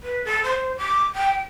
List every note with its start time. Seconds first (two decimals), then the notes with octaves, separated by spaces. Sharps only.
0.03 B4
0.24 A4
0.43 C5
0.77 D6
1.15 G5